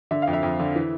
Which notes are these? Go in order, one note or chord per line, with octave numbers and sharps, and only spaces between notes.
D3 E5
F5
F2
E5
F2
D3
E3